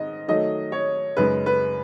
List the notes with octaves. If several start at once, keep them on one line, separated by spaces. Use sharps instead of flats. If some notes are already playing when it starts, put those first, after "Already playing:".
Already playing: G#2 D#3 D#5
D#3 F#3 A3 D#5
C#5
F#2 C#3 G#3 D#4 B4
B4